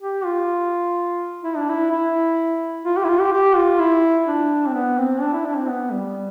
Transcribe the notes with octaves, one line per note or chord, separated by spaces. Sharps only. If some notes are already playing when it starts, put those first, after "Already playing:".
G4
F4
E4
D4
E4
E4
F4
G4
E4
F4
G4
G4
F4
E4
D4
C4
B3
C4
D4
E4
D4
C4
B3
G3